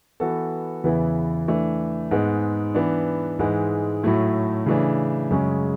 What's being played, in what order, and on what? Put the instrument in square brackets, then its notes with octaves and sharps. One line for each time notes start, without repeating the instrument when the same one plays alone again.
[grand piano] E3 B3 F#4 A4
E2 C#3 E3 B3 E4
E3 A3 D4
G#2 G#3 B3
E3 B3 D4
G#2 E3 G#3
A2 F#3 A3 E4
C#3 E3 A3 D4
F#2 C#3 G#3 C#4